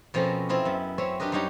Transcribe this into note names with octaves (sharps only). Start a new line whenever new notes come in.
B2 F3 C4 C#4 A4 A#4
C4 E4 F4 D#5
F#2 B3
C4 C#4 C#5 E5
D4 G4 A#4 B4 D#5
F#2 G3 D#4 G4 C#5 A#5